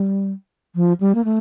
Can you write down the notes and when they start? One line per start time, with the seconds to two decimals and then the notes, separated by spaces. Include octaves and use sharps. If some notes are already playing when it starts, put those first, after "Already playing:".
Already playing: G3
0.76 F3
1.00 G3
1.15 A#3
1.25 A3